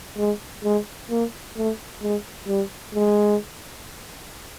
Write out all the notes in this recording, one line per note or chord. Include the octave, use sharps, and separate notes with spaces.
G#3
G#3
A#3
A3
G#3
G3
G#3